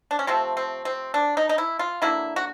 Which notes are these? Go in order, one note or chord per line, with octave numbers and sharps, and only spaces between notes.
D4
C#4
C3 F3 A3 C4
C4
C4
D4
D#4
D#4
E4
F4
D3 F#3 A#3 E4
F#4